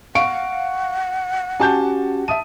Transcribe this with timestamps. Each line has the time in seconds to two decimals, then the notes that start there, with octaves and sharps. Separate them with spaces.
0.15 F5 F#5 C#6 D7
1.60 C#4 F#4 G4 G#5 A5 G6
2.28 E5 A5 D#6 D#7